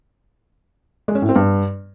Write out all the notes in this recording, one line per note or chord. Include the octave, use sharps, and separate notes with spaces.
G#3
C#4
A2
C4
G2